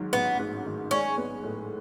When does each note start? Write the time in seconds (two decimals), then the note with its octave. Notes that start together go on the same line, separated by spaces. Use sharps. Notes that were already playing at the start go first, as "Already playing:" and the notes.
Already playing: G#2 D#3 F#3
0.13 A1 B3
0.39 G#2
0.65 D#3
0.91 G#3 C#4
1.18 B3
1.44 A2